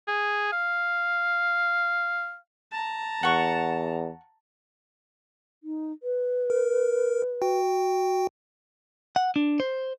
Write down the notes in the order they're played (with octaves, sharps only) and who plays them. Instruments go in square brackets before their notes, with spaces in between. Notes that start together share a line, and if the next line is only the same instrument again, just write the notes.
[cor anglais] G#4
F5
[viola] A5 A#5
[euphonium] E2 [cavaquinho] F#5 C#6
[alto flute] D#4
B4
[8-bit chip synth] A#4
F#4 G5
[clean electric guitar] F#5
D4
C5